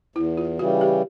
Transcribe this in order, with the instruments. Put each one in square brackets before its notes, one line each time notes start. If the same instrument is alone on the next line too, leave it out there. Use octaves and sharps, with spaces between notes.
[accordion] E2 [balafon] E4
[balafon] F4
[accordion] C#3 E3 G3 [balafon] F#4
[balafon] G4